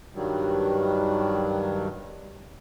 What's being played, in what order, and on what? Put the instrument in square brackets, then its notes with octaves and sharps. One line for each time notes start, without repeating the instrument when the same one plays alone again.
[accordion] G2 D#3 F#3 G3